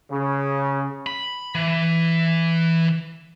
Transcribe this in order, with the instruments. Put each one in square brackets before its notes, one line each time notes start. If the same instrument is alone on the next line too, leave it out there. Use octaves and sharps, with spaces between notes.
[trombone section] C#3
[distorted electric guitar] B5
E3